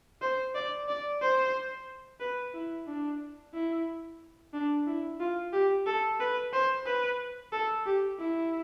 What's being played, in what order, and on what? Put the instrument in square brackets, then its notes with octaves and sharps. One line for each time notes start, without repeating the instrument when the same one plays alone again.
[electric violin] C5
D5
D5
C5
B4
E4
D4
E4
D4
E4
F4
G4
A4
B4
C5
B4
A4
G4
E4